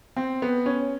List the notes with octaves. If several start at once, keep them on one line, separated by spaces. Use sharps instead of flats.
C4
B3
C#4